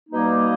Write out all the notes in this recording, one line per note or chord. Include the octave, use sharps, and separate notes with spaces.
B2 G3 A#3 D#4